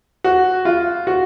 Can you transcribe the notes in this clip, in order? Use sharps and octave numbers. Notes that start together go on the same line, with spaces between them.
F#4
F4
F#4